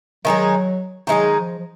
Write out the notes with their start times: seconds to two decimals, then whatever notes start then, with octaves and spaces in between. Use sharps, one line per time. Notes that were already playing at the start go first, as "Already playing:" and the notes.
0.25 D#3 F#3 G#3 D#4 G#4
1.07 D#3 F#3 G#3 D#4 G#4
1.35 F3
1.59 F3